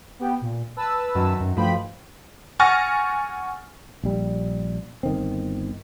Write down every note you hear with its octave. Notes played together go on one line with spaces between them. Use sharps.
B3 G4
A#2
B4 A5 E6
F#2 D#3 F#3
F#2
G2 F3 A3 G5 B5
F#5 G#5 C#6 F6 A6 A#6
A#1 G3
G1 D#3 C4